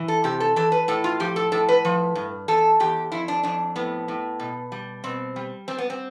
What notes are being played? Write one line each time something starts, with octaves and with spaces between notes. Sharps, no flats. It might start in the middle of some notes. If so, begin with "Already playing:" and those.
Already playing: E3
A4
C3 G4
A4
E3 A4
B4
A2 A4
F4
F3 G4
A4
A2 A4
B4
F3
G2
E2 A4
E2 G4
F2 E4
D4
F2 D4
A2 B3
A2
B2
G3
B2 C4
G3
G3 C4
B3
C4